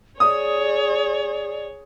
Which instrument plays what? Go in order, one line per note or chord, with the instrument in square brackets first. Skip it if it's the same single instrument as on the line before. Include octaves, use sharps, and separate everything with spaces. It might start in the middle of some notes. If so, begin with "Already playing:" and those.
[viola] G#4 C#5 [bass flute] D5 [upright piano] D#6